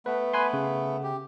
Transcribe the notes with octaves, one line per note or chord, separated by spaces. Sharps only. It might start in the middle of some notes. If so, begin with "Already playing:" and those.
A3 B3 B4
B4 G#5 C6
C#3
G4